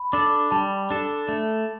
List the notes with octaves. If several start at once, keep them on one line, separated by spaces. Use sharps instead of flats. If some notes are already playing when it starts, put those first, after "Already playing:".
Already playing: B5
D4 A4 D6
G3 A5
D4 A4
A3